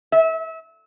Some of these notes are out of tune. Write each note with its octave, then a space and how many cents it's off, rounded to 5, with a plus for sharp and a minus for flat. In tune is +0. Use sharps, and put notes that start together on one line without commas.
E5 -30